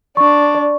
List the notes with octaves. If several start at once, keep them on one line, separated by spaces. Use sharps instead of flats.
D4 C#6
D5